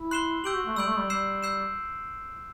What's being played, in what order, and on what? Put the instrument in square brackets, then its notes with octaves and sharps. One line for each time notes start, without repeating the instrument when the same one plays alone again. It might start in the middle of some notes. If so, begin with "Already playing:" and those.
Already playing: [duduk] E4
[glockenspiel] C6 F#6 C7 E7 G7
[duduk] G4 [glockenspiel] E6 G6 D7 F#7
[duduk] F#4
A3
[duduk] G3 [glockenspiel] E6 G6 D7 F#7
[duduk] A3
G3
[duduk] G3 [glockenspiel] E6 G6 C7 E7
[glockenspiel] E6 G6 C7 E7